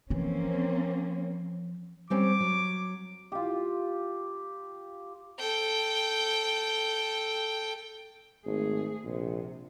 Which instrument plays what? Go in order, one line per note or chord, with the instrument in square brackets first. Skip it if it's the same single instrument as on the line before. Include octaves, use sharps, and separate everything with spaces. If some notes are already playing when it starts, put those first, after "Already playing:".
[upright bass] E3 F3 [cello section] A#3 C4 C#4
[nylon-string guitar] G3 C4 C#4 [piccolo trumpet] D6
[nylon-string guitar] F#3
[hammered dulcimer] F4 G4
[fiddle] A4 G5
[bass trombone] G#1 [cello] A3 G#4
[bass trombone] A#1 [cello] C3